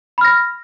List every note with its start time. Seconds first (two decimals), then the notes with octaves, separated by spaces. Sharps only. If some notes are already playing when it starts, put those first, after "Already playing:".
0.18 B5
0.21 F6
0.24 A#6